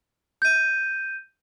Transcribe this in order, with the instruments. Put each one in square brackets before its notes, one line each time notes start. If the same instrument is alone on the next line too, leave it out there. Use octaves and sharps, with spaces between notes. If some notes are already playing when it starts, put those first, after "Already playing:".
[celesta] G6 D#7